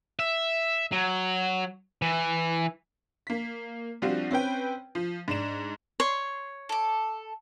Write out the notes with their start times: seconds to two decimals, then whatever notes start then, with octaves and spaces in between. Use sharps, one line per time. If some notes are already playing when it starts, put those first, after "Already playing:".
0.19 E5
0.92 F#3
2.02 E3
3.27 A#3 B6
4.02 F3 G3 C4 D4 F4 F#4
4.31 C4 C#4 B4 G5
4.95 F3
5.28 G#2 D4 E7
6.00 C#5 C6
6.69 A4 D6